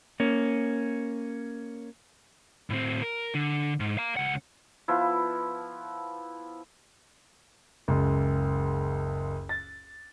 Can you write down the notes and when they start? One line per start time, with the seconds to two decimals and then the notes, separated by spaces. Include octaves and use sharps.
0.20 A#3 C#4
2.70 A2 C4
3.03 A#4
3.35 D3
3.80 G#2
3.98 F5 A#5
4.17 C#2 F#5
4.88 F3 B3 E4
7.88 F#1 C#2
9.49 A6